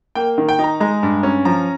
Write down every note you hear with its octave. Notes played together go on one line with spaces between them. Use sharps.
A#3 G5
D#3
G5
D#4
A#5
G#3 A#5
G2
C#4
F3 A#5